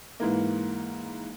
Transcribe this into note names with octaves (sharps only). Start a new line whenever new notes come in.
G#2 E3 A#3